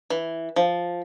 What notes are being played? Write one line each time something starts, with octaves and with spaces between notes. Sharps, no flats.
E3
F3